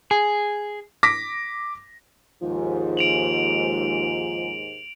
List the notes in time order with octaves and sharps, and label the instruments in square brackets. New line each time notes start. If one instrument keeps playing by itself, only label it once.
[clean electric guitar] G#4
[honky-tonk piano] D6 A#6 B6
[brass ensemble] D#2 G#2 [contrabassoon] F3
[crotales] D7 F7 F#7